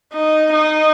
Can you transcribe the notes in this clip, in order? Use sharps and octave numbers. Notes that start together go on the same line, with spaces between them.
D#4
D#4